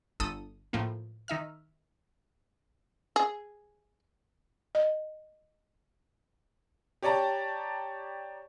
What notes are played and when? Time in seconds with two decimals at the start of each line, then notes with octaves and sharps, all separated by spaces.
0.20 G1 A4 D#6
0.73 A2 F3 A#3
1.28 D#3 D#4 E5 F6
3.16 G#4
4.75 D#5
7.02 G4 C#5 D5 G5 A5 A#5